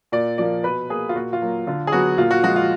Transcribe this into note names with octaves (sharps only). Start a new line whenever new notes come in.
A#2 D5
F3 A#3 D5
B2 B4
A#3 G#4
F4
A#2 F#4
F4
F#3 A#3
D3 F4
G#4
F#3 B3 F#4
A#2 F4
F#4
F3 G#3 F#4
F4